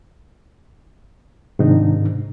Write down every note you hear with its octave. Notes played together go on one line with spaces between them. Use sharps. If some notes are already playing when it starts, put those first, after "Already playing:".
G#2 C3 D#3 D4 D#4